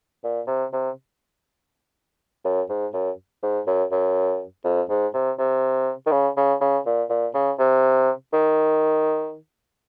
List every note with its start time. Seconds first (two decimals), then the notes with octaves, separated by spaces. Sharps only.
0.24 A#2
0.47 C3
0.73 C3
2.45 F#2
2.69 G#2
2.93 F#2
3.43 G#2
3.67 F#2
3.91 F#2
4.64 F2
4.90 G#2
5.14 C3
5.39 C3
6.06 D#3
6.12 C#3
6.37 C#3
6.61 C#3
6.86 A#2
7.09 A#2
7.34 C#3
7.59 C3
8.33 D#3